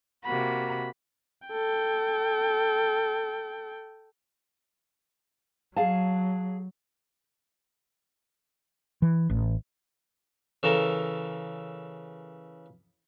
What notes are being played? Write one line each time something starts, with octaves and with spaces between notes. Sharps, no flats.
C3 A#3 F#4 B5
A4 G5
F#3 G#4 F5 A5
E3
A1
C#3 E3 A4 A#4